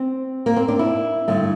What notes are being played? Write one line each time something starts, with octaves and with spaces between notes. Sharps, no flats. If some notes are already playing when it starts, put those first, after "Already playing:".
Already playing: C4
A#3
C4
D4
E4
G2 D3 A3